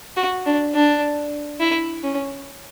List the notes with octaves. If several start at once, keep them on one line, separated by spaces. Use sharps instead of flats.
F#4
D4
D4
E4
C#4